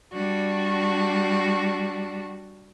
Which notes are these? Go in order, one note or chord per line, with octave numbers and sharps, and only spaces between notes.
G3 D4 F#4